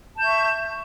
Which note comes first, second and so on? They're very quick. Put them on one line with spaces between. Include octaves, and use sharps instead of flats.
A5 G6 E5 C#6